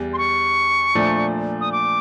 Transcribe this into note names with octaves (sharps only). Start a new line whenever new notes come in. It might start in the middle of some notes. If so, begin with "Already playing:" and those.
Already playing: E2 G3
C6
C#6
A#2 F3 A3 D4
D#6
D6